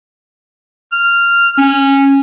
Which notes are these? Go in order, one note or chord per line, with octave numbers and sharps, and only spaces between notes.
F6
C#4